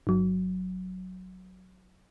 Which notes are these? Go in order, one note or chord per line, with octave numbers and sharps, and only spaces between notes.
G1 F#3